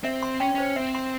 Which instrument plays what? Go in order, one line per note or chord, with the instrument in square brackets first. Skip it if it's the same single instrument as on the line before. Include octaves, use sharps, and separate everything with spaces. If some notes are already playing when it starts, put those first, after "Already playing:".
[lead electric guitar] C4 [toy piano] E5
[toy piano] C6
[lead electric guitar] C#4 [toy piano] G5
[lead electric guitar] C#4 [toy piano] C5
[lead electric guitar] C4 [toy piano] E5
[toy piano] C6